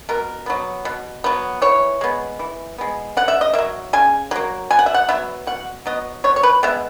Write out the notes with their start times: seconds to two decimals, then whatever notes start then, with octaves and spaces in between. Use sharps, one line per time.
0.09 B2 A#4
0.46 F#3 B3
0.85 B2
1.24 F#3 B3
1.62 E3 C#5
2.01 G#3 B3
2.39 E3
2.78 G#3 B3
3.17 C#3 F#5
3.28 E5
3.41 D#5
3.53 F#3 A#3 E5
3.93 C#3 G#5
4.31 F#3 A#3
4.70 B2 G#5
4.79 F#5
4.86 E5
4.94 F#5
5.09 F#3 B3 E5
5.47 B2 F#5
5.86 F#3 B3 D#5
6.24 B2 C#5
6.36 C#5
6.43 B4
6.63 G#3 B3 E5